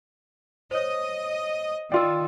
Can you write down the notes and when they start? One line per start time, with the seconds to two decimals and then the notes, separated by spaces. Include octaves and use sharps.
0.71 C5 C#5 D#5
1.92 D#3 F4 D5 G5 C6 E6